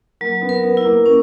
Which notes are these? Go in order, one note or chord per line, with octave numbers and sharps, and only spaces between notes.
F#3 A#3
B3
A#4
B3
E4
A#3
A#3 C#4